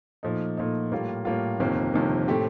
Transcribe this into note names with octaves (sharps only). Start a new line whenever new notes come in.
A#2 F3 A3 D#4
A#2 F3 A3 D#4
A2 G3 A#3 F4
A2 G3 A#3 F4
G1 F2 C3 D#3 A#3
G1 F2 C3 D#3 A#3
A2 A3 C4 G4